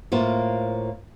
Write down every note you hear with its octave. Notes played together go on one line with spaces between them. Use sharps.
A2 A#3 F4 C5